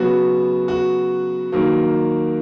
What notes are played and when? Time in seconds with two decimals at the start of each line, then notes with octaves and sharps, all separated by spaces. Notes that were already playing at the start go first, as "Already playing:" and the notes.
Already playing: C#3 F#3 B3 F#4
0.68 F#4
1.52 D#3 F#3 A#3